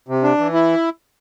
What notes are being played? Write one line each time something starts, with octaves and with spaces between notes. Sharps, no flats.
C3
D4
E3
E4